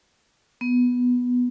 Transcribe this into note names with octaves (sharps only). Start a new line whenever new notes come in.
B3